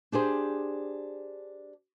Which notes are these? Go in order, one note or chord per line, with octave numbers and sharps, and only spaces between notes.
D4 G4 G#4 C5